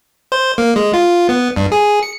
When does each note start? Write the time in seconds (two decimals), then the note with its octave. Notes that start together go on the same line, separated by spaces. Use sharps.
0.32 C5
0.58 A#3
0.76 G#3
0.93 F4
1.29 B3
1.56 G2
1.72 G#4
2.03 C#7